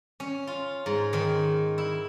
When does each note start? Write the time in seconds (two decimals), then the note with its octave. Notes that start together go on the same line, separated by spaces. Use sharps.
0.20 C#4
0.47 F4
0.86 G#2
1.13 D#3
1.78 E4